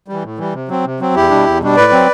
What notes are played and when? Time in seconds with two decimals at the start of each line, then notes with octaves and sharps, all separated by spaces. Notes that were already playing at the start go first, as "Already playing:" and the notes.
0.08 E3 G3
0.24 A2
0.39 E3 G3
0.54 C3
0.69 F#3 C4
0.85 C3
1.00 F#3 C4
1.14 E2 E4 G4
1.30 B2 G3 D4
1.46 E2
1.60 B2 G3 D4
1.76 A2 B4 D5
1.92 F#3 C4